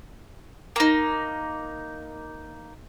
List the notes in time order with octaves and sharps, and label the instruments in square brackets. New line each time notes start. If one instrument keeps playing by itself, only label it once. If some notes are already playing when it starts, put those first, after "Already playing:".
[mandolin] A#3 D#4